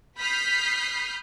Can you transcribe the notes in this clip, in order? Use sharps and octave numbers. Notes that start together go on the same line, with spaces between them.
B5 D#6 F6 G6 B6 C7